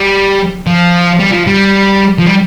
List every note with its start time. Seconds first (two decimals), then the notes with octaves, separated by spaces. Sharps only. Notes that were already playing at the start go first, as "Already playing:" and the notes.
Already playing: G3
0.67 F3
1.19 G3
1.31 F3
1.47 G3
2.19 F3
2.27 G3